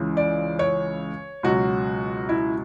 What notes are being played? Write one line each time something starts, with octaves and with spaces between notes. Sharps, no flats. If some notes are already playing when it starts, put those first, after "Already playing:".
Already playing: C#2 C#3 E3
D5
C#5
C#2 B2 F#3 F#4
E4